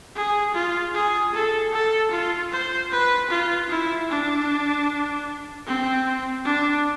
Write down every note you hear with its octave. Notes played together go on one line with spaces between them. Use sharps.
G#4
F4
G#4
A4
A4
F4
C5
B4
F4
E4
D4
C4
D4